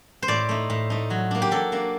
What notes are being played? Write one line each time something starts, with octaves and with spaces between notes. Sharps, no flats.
C5
A2 D5
A3 D#4
A2
A3 D#4
F#3
A#3 D4
G4
F#3 A4
A#3 D4